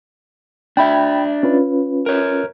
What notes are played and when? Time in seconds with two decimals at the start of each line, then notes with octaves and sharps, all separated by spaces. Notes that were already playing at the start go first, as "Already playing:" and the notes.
0.77 D4 E5 G5 B5
1.43 C#4 F4 B4
2.06 A#4 C#5